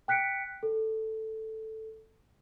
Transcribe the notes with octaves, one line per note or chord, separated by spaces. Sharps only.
G5 F#6 B6 C#7 D7
A4